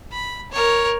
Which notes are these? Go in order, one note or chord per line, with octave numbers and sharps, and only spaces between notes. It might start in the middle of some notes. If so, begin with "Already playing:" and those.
B5
A#4 C#5